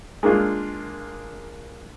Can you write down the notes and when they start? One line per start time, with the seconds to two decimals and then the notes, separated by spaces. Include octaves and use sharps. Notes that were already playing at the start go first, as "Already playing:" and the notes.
0.23 G#3 A#3 D4 F4